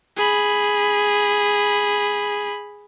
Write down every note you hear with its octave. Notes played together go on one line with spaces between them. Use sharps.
G#4 B5